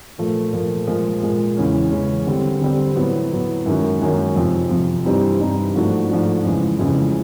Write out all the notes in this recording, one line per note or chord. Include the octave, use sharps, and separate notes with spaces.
A#2 F3 A3
A#2 F3 A3
A#2 F3 G#3
A#2 F3 G#3
E2 C#3 E3 G#3 C#4
E2 C#3 E3 G#3 C#4
D3 G3 C4
D3 G3 C4
A2 F#3 B3
A2 F#3 B3
F#2 D#3 G#3 C#4 F#4
F#2 D#3 G#3 C#4 F#4
F2 C3 F3
F2 C3 F3
G2 E3 G3 C4 D#4
G2 E3 G3 C4 D#4
G#2 F3 A3 D4 F#4
G#2 F3 A3 D4 F#4
F2 C#3 E3 G#3
F2 C#3 E3 G#3